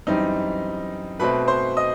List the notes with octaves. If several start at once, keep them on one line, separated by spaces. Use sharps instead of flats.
F#2 E3 G3 C4 D#4 D#5
B2 A3 C4 B4 B5
C5 C6
D#5 D#6